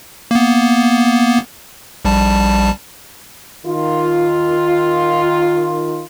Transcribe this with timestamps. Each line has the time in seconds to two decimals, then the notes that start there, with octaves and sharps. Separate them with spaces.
0.31 A#3 B3
2.05 A#1 G3 A5
3.66 D#3 F4